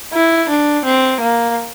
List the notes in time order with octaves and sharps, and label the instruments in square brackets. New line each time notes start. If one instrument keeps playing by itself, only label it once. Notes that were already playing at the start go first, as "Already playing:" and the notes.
[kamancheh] E4
D4
C4
A#3